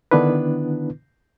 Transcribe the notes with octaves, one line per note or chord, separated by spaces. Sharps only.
D3 D#3 B3 D4 E4 B4